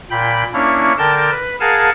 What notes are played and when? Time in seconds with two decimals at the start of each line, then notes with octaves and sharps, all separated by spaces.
0.10 A#2 G5 B5
0.53 A#3 C#4 D4 E4 C#5
0.98 D3 A#4 G5 A5 G6
1.31 B4
1.60 G#4 A#4 F5 F#5 G#5 A5